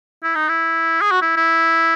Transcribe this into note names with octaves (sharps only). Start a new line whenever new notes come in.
E4
D#4
E4
G#4
F#4
E4
E4